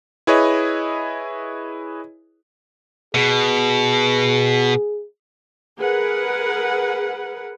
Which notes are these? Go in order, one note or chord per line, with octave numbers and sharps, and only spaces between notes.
E4 G#4 B4 C#5 D#5
B2 G#4
G#4 A#4 B4 F#5